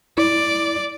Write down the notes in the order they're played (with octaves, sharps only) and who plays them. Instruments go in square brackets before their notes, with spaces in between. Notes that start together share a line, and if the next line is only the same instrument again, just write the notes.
[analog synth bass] E4 [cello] D5